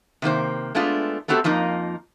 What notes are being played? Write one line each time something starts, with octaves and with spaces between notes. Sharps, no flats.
C3 D#3 A#3 C5
G#3 A3 B3 D4 F4
A3 B3 C4 F#4 G4 A4
F2 F3 A#3 D#4 A#4